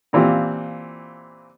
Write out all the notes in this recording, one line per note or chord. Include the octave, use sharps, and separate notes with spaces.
A#2 E3 C4 F4 G4